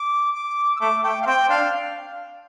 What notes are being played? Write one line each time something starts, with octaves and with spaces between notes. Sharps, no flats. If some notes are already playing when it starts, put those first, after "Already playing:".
Already playing: D6
D6
E6
A3 D6
A3 G5
F5
C4 G5
D4 F5